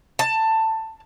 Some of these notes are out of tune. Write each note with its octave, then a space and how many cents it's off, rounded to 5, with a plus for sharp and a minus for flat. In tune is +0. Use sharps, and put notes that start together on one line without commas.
A5 +15